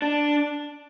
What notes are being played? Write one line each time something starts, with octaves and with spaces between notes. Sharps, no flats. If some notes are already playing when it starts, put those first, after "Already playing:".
D4